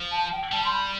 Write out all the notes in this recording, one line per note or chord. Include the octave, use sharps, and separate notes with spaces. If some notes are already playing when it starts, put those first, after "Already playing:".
Already playing: F3
A5
G5
G3 A5
C6
B5